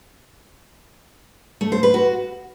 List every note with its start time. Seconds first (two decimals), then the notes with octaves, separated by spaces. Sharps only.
1.61 A3
1.72 C5
1.83 B4
1.94 F#4